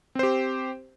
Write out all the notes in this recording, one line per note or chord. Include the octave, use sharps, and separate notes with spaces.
C4 G4 C5